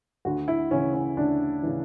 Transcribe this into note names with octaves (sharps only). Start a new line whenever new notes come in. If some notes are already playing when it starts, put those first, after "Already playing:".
D2 F#4
E4
C#3 E3 C#4
C#4
D2 D4
C#3 E3